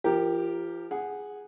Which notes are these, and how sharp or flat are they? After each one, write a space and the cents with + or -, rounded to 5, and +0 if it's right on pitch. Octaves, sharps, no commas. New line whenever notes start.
F3 -35 G4 +0 A#4 +0
G#4 +0 F#5 +0